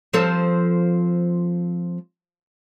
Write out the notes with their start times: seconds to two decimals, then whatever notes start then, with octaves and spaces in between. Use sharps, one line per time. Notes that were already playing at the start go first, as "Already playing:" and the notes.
0.13 F3 C4 A4